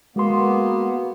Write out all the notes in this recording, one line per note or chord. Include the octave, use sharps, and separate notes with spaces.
G#3 A#3 B3 F#4 C6